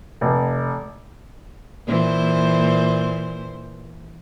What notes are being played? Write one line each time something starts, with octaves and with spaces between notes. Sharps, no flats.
F1
A#2 E3 C5